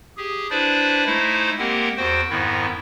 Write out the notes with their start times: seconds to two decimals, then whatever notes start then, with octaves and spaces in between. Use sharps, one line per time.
0.17 G4 G#4
0.50 D4 E4 B4 C5 D5
1.06 G#3 A3 D#4 E4 C5
1.58 G#3 A#3 C4 G4 A#4 F#5
1.97 E2 F#4 C5 G5
2.29 F2 G#2 D#3 B3 E4